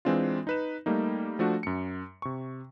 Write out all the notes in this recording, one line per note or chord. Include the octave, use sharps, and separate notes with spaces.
E3 G#3 C4 D4 F4
D#4 B4 E7
G3 A3 A#3 D#4
F3 A3 D4 F#4
F#2 C#7
C3 C#6